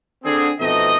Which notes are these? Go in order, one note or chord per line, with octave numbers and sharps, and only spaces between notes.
D3 C4 G#4
F2 B2 A3 C4 D#4 D#5